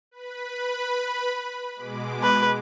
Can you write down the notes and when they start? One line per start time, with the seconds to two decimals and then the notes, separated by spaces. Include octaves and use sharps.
0.11 B4 B5
1.75 B2 G#3 D6
2.23 B4